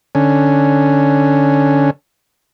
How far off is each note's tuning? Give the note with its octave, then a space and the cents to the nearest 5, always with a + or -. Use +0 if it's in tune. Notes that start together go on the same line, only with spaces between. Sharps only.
D3 +10 C#4 +0